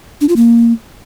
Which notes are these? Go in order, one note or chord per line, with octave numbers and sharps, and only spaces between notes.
D4
F4
A#3